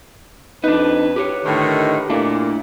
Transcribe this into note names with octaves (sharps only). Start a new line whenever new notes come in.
F2 D4 D#4 B4
G4 B4 C#5
A2 D3 D#3
A#2 A3 A#3 D4 E4